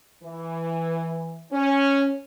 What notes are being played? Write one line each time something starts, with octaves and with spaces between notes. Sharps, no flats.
E3
C#4